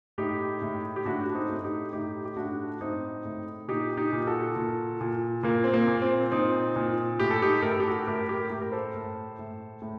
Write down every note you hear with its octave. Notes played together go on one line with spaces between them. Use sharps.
A2 D#4 G4
A2
G4
A2 D4 F#4
F#4
C4 D#4
A2
D#4 G4
A2 D#4 G4
G4
A2 D4 F#4
A2 C4 D#4
A2
A#2 D#4 G4
D#4 G4
A#2
F#4 A4
A#2
A#2
A#2 A#3
C4
A#3
A#2
C4
A#2 C4 D#4
A#2
A2 G4
A4
D#4 G4
A2 A#4
A4
G4
F#4 A4
A2 G4 A#4
G4 A#4
A2
A#4
A4 C5
A2
A2
A2